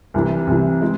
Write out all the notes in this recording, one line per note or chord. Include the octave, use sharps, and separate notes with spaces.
C2 C3 E3
C2 C3 E3
E3 G#3